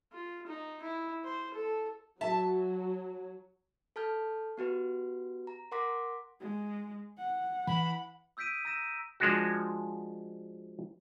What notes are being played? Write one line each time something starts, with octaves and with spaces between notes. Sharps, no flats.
F4
D#4
E4
C5
A4
F#3 E5 A5
A4 A5 F6 G6
B3 F#4 G4 B4
A#5
A#4 F#5 C6 D6 A#6 B6
G#3
F#5
E3 B5
D#6 E6 G6 B6 D7 D#7
A#5 E6 G6 A#6 D#7 E7
F3 G#3 D4 F#4